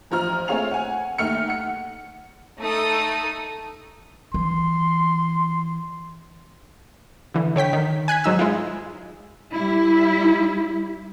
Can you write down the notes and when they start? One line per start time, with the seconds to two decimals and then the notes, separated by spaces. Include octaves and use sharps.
0.11 A1 F3 A#5 F6
0.48 A3 C4 G#4 C#5 F5 F7
0.71 F#5 G#5
1.18 D#2 A3 F6 C#7
1.48 F#5 C#7
2.59 A3 D#4 A4 D#6
4.34 E3 C6
7.34 D3 E3
7.56 D3 C#5 G5 B6
7.73 D#3
8.08 G#5 F#6 G#6 B6
8.24 G#2 F#3 D#4 E6
8.39 G#3 E4 F4
9.53 G3 E4